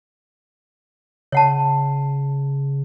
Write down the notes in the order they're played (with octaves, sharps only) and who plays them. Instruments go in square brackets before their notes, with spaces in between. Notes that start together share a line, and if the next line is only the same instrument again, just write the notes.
[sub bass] C#3 [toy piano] C#5 F#5 A5